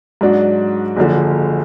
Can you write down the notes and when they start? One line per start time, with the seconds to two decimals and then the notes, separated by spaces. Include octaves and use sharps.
0.21 G#2 F#3 D4 F#4
0.96 F#1 F#2 D3 F3